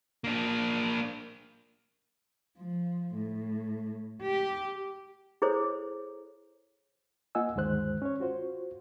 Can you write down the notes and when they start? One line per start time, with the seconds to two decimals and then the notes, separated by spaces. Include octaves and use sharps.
0.24 A#3 D4
2.58 F3
3.15 A2
4.22 G4
5.42 E4 G#4 A4 C5 C#5
7.35 A#3 F4 D#5 F#5 G#5 E6
7.56 D2 G2 D#3 G#3 C5 F#6
8.02 C#4 C#5
8.20 F4 F#4 C5